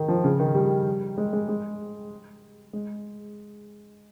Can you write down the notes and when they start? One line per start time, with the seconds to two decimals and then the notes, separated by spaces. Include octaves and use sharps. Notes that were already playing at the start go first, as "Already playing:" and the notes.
Already playing: D#3
0.08 F3
0.24 C#3
0.40 D#3
0.55 G3
1.18 G#3
1.33 G#3
1.49 G#3
2.73 G#3